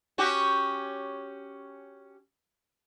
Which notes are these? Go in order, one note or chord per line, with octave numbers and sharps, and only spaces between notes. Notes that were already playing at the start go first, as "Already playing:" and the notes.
C#4 F#4 G4